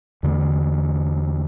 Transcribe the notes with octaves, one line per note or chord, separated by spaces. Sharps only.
E2 D3 A3